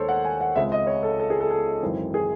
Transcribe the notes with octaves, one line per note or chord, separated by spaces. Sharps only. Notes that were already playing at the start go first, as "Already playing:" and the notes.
Already playing: D#2 D#3 G#3 A4 C5 C#5
F#5
G#5
F#5
C#2 C#3 G#3 C4 E5
D#5
C#5
A4
A4
G#4
A4
A4
G#1 F#2 E3 C4
G#4